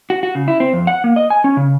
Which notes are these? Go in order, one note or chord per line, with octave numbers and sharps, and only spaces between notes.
F#4
F#4
C#3
E4
C4
F2
F#5
A#3
D#5
G#5
C#4
C#3